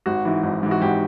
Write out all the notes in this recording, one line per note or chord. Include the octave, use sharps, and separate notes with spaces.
G#1 F#4
G#2 E3
G#1
G#2 E3
F#4
G#1 G4